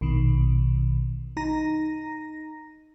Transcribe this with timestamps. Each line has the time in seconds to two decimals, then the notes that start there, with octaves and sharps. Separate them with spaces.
0.01 A#1 B2 D#3
1.37 D#4 A#5 A#6